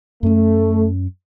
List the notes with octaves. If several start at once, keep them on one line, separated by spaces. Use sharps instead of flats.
F#2 A3 C#4